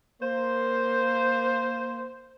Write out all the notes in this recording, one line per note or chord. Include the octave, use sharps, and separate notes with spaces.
A#3 C5